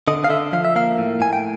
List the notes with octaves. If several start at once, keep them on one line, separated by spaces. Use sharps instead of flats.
D3 D#5
F5
D3 E5
F3 F5
E5
A#3 F5
A2
A2 G#5
G5